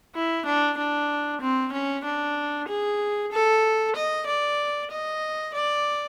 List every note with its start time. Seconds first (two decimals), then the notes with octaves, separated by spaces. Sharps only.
0.15 E4
0.45 D4
0.77 D4
1.41 C4
1.72 C#4
2.04 D4
2.68 G#4
3.32 A4
3.96 D#5
4.26 D5
4.91 D#5
5.54 D5